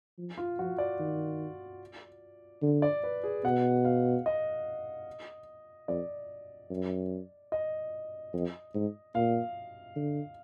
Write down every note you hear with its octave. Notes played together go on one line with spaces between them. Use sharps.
F3
F4
F3 F#4
D5
D#3
D3
D5
B4
G#4
B2 F#5
F5
D#5
F2 D5
F#2
D#5
F2
G#2
A#2 F5
D3